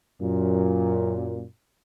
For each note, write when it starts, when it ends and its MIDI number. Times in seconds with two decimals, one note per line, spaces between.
0.21 1.45 42
0.21 1.45 46